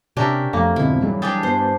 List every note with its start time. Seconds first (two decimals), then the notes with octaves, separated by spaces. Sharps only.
0.17 C3 C#4 D4 G4 A#4 E5
0.53 F2 F3 A3 A#3 A4 A#5
0.76 F2 G#2 B2 D3 G#3 B3 E4
1.02 E3 F#3 G3 G#4
1.22 D4 G4 G#4 G5 A5 D#6
1.43 G2 B3 C5